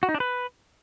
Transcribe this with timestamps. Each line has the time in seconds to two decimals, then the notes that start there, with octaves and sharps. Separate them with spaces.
0.03 F#4
0.09 D#4
0.14 D4
0.20 B4